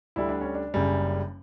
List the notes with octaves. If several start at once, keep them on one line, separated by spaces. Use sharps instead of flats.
D2 D3 G3 E4
D4
C#4
D4
F#1 F#2 C#3 G3